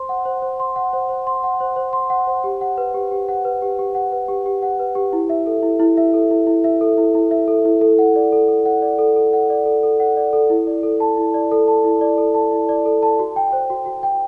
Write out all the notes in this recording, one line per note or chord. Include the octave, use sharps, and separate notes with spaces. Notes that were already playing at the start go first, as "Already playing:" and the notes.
Already playing: C5 C6
F#5
C5
C5
C6
F#5
C5
C5
C6
F#5
C5
C5
C6
F#5
C5
G4
F#5
B4
G4
G4
F#5
B4
G4
G4
F#5
B4
G4
G4
F#5
B4
G4
E4
E5
A4
E4
E4
E5
A4
E4
E4
E5
A4
E4
E4
E5
A4
E4
A4
F#5
D5
A4
A4
F#5
D5
A4
A4
F#5
D5
A4
A4
F#5
D5
A4
E4
D5
A4
A5
E4
D5
A4
A5
E4
D5
A4
A5
E4
D5
A4
A5
F#4
G5
C5
F#4
F#4
G5